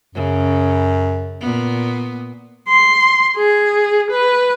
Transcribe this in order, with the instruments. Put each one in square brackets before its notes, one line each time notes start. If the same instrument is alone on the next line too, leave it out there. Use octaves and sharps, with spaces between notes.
[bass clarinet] F#2 [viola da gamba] C#3
[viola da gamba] A#2 B3
[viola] C6
G#4
B4